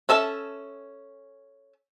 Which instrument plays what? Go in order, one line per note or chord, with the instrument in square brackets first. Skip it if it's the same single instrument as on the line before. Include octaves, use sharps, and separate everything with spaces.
[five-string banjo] C#4 A4 E5 A5